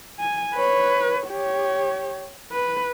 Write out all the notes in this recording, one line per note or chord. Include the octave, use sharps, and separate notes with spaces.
G#5
B4 C#5
G4 C#5
B4